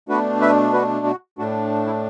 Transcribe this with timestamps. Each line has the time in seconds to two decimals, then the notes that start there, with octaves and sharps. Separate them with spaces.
0.09 B2 A3 D4 F#4 B4
0.41 B4 E5
0.73 F#4 B4
1.06 F#4
1.38 A2 A3 D4 F#4
1.86 E4